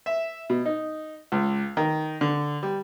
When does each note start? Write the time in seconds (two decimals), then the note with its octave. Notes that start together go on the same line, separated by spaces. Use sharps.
0.06 E5
0.50 B2
0.65 D#4
1.32 C#2
1.77 D#3
2.21 D3
2.63 G3